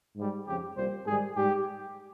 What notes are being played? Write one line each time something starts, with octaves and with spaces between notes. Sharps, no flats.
G#2 G3
F2 C#3 F3 G4
C2 A#2 G3 C5
G#2 D#3 G3 G#4
G#2 G3 G4